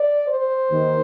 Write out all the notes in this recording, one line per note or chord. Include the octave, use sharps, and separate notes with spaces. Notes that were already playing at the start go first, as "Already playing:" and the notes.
Already playing: D5
C5
D#2 D#3